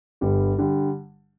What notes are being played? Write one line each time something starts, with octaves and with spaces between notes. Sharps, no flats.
G1 G2 D3 G3
D3 G3